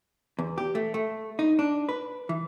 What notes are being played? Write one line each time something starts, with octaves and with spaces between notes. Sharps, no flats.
E2
G4
A3
A3
D#4
D4
B4
E3